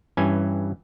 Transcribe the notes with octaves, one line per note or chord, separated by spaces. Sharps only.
G2 E3 C#4 G#5